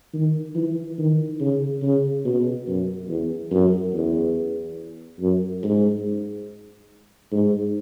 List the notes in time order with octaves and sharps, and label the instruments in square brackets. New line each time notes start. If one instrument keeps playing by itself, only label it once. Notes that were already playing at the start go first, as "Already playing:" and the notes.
[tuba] D#3
E3
D#3
C#3
C#3
B2
F#2
E2
F#2
E2
F#2
G#2
G#2